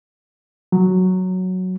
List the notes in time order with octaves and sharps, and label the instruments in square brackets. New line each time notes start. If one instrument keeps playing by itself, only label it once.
[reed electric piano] F#3